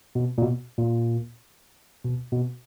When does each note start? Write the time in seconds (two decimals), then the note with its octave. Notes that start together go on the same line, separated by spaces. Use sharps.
0.15 B2
0.38 A#2
0.42 B2
0.78 A#2
2.05 B2
2.32 B2